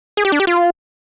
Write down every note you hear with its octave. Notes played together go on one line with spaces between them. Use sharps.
G#4
G4
D4
G4
F4